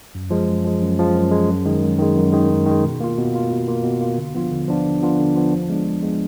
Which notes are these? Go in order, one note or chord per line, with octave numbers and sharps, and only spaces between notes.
F#2
F3 G#3
F#2
F3 G#3
F#2
F3 G#3
F#2
F3 G#3
F#2
D#3 G#3
F#2
D#3 G#3
F#2
D#3 G#3
F#2
D#3 G#3
B2
A#3 F4
B2
A#3 F4
B2
A#3 F4
B2
A#3 F4
D3
F3 B3 D4 F4
D3
F3 B3 D4 F4
D3
F3 B3 D4 F4
D3
F3 B3 D4 F4
F3
G#3 B3 D4
F3
G#3 B3 D4